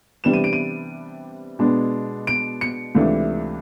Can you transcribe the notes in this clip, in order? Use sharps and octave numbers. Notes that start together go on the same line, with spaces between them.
C3 E3 G3 B3 D4 E7
D#7
D7
D#7
B2 G#3 B3 D4
D7
C#7
C#2 C3 E3 A3 D4